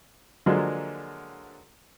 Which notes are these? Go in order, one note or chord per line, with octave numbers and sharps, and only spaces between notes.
D3 F3 F#3 G#3 A#3 D4